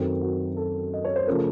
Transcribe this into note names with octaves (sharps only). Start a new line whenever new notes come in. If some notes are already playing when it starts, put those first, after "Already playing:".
Already playing: F#2 D#3 F#3 C4 A4
F#4
A4
D#5
C#5
C5
C#3 F3 A3 A#4